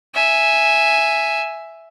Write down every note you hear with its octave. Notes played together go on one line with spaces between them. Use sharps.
E5 G#5